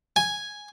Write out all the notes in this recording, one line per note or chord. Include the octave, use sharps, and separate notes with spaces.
G#5